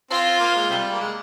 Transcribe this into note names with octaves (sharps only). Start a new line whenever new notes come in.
C4 F4
A#3
G#3
C3 G3
A#3
G#3